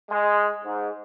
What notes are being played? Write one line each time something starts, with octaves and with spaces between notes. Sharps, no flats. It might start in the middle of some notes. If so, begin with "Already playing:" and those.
G#3
G#2